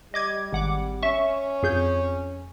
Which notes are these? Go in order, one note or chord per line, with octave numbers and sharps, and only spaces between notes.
G3 D#5 D6 G#6
G#1 F#5 D6
C#4 E5 C#6
F2 G#4 G6